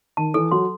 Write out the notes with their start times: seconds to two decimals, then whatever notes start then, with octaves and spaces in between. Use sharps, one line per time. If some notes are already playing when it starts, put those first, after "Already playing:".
0.17 D#3 A5
0.34 E3 A4
0.51 F#3 C6